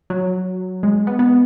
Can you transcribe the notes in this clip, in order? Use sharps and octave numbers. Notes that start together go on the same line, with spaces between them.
F#3
G#3
B3
B3